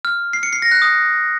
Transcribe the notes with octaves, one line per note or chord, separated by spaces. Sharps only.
F6
C7
C#7
C7
A#6
F#6
D#6